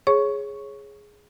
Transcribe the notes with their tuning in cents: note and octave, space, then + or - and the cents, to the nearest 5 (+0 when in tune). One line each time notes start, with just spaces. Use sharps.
G#4 +0 C#5 -15 C#6 +0